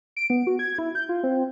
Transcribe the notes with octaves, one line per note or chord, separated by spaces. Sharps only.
D7
B3
F#4
G#6
E4
G6
F4
C4